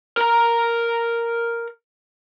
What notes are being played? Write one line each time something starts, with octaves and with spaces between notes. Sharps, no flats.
A#4 A#5